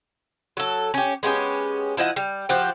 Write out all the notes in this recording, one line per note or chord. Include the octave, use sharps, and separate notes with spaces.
F#3 A4
C#4 G4
G#3 B3 C#4 G4
F3 E4 D#5 F#5
G3
F3 F#4 G4